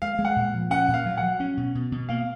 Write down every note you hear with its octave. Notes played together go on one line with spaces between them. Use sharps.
G#3 F5
G#3
F#5
A#2
F3
C#4 F#5
A#2
F5
F#3
F#5
F#3
C#4
B2
B2
B2
A#3 F5